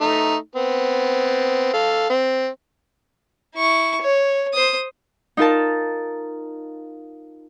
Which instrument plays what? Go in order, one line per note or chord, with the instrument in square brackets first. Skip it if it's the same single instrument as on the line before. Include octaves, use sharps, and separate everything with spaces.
[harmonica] A3 D#4
B3 C4
A4 F5
C4
[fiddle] E4 C#6
C#5
C5 D#6
[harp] D#4 F4 A#4 A5